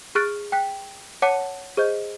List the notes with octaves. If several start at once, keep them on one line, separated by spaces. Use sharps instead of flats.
G#4 C#6 F6 F#6 A6 D7
G5 F#6 B6
C#5 F#5 A5 D6 C#7 D#7
G#4 C5 D#5 G6